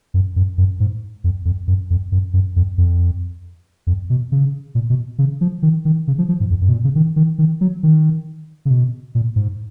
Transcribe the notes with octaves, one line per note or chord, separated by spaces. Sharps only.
F#2
F#2
F#2
G#2
F2
F2
F#2
F2
F#2
F#2
F2
F2
F2
B2
C#3
A#2
B2
C#3
F3
D#3
D#3
C#3
F3
F3
G#2
F2
F#2
B2
A#2
C#3
D#3
D#3
D#3
F#3
D#3
C#3
B2
A#2
G#2